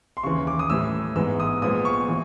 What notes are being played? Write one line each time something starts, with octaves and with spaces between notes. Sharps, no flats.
C6
D#2 C#3 E3 C#6
D6
D#6
A2 E3 G3 E6
G#2 E3 G#3 B3 E6
D#6
A#2 F3 G#3 B3 D#6
C#6
E3